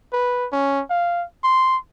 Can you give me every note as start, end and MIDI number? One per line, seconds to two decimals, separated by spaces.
0.13 0.47 71
0.52 0.82 61
0.90 1.25 77
1.44 1.77 84